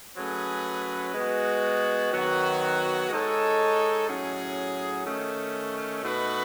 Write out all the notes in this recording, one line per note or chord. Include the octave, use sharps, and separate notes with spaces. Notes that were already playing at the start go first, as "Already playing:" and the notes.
F#3 A3 C#4 G#4 B4
G#3 B3 F#4
D#3 F#3 B3 F#4
G#3 D#4 A4 C#5
A2 F#3 C#4 G#4
D#3 A3 C#4
B2 A3 D#4 F#4 B4